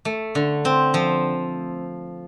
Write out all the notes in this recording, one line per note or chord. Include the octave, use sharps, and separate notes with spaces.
A3
D3
C4
F3